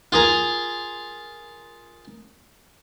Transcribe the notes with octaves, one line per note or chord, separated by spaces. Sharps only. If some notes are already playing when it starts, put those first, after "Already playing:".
F4 G#4 A#4